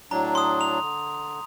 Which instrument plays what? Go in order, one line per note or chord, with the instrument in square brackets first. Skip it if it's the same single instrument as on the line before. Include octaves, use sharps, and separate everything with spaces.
[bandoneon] A2 F#3 D4 [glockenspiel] A#5
[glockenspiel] C6 D#6
F7
[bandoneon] D3